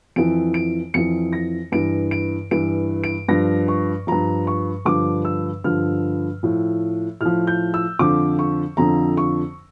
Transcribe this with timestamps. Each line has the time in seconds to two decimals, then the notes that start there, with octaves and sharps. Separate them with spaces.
0.16 F2 E3 D7
0.54 D7
0.94 F2 E3 C#7
1.33 A#6
1.72 G2 E3 D7
2.11 D7
2.51 G2 E3 D7
3.04 D7
3.28 G2 F3 A#6
3.68 C#6
4.07 G2 F3 A#5
4.47 C#6
4.85 G2 D3 F3 D6
5.25 E6
5.64 G2 D3 F3 F6
6.43 A2 F3
7.21 A2 F3 F6
7.47 G6
7.74 E6
7.99 F2 D3 F3 D6
8.39 C#6
8.77 F2 D3 F3 A#5
9.17 C#6